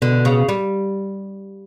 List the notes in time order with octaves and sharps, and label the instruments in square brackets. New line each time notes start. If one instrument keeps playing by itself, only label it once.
[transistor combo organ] B2 [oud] D3
[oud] C#3
G3